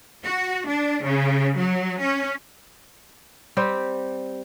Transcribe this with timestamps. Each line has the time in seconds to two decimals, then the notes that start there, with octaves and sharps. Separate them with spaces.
0.24 F#4
0.66 D4
1.03 C#3
1.56 F#3
1.99 C#4
3.57 G3 C4 G4